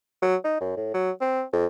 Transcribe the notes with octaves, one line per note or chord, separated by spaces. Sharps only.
F#3
D#4
F#2
A2
F#3
C4
F2